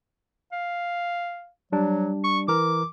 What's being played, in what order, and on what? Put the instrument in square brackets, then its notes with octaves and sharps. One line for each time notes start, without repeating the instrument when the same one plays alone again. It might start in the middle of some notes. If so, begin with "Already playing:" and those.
[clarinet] F5
[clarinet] F#3 [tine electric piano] G3 D4
[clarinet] C#6
[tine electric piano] E3 A#4 [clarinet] D6